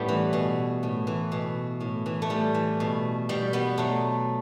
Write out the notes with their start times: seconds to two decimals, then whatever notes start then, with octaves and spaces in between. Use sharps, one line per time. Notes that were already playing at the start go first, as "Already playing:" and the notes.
Already playing: A2 G3 B3 C#4
0.09 E3
0.33 B2
0.83 A2
1.07 E3
1.32 B2
1.81 A2
2.06 E3
2.22 A3
2.30 A2 G3
2.54 E3
2.80 B2
3.29 B2 G3
3.53 G3 B3
3.78 B2 F#3 A3